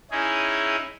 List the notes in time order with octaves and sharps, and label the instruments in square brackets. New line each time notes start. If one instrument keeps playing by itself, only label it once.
[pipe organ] C#4 D#4 E4 G#4